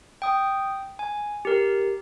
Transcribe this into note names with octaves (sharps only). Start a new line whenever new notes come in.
G5 D#6
G#5
G4 A#4